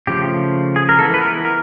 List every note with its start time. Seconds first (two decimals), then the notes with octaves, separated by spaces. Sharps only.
0.07 C#3 F3 A3 G4
0.76 G#4
0.89 A#4
0.99 E3 G#3 B3 A4
1.14 B4
1.21 A#4
1.45 A#4